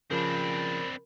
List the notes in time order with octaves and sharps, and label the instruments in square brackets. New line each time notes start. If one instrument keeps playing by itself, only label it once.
[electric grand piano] C#3 F3 [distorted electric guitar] C4 D4 [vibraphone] A#4 B5